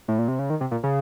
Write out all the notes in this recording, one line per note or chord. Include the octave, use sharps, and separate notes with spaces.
A2
A#2
C3
C#3
D#3
C3
A#2
C#3